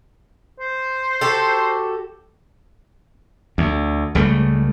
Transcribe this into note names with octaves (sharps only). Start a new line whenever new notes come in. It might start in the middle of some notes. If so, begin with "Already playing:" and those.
C5
F#4 G4 A4
D2
C#2 C#3 G3 A3